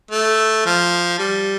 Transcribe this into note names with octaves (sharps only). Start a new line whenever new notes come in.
A3
F3
G3